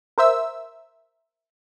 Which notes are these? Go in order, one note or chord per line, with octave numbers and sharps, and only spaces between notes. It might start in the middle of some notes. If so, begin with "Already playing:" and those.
A#4 C5 E5 E6